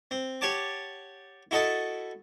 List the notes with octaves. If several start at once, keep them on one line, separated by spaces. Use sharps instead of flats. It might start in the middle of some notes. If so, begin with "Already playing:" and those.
C4
G4 C#5 F#5 A5 D6
E4 F#4 A4 D#5 F#5 A5